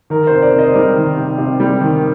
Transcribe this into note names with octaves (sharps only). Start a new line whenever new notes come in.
D#3 A#4
C3 C5
A#4 D5
C3
C5 D#5
G3 A#4
D#3
C3
C3
G3
D#3